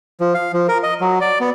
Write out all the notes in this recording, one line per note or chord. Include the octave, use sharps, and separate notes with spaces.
F3
F5
F3
A#4
D#5
F#3
D5
B3